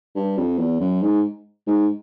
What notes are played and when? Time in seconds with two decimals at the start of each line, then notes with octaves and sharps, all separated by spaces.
0.15 G2
0.37 F2
0.59 E2
0.80 F#2
1.02 G#2
1.67 G#2